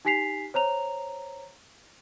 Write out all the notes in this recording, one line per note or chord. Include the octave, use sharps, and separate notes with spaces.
D#4 G4 G#5 B6 C7 F7
C5 C#5 A#5 F7